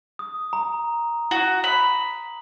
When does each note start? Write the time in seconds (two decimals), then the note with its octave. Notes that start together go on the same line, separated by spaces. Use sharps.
0.19 D#6
0.53 A#5
1.31 F#4
1.64 B5